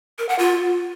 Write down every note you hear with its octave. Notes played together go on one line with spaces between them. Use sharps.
A#4
F#5
F4